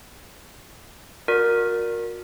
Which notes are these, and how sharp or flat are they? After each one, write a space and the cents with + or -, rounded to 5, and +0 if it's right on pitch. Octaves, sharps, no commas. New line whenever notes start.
F#4 -40 A#4 +0 D5 +0